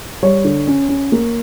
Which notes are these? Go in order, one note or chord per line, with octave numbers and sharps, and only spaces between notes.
G3 C#5
D3
C#4
C#4
A#3